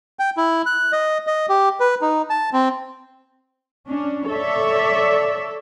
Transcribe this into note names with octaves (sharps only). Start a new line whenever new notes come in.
G5
E4
F#6
D#5
D#5
G4
B4
D#4
A5
C4
C#4 D4
A4 C#5 D5 E5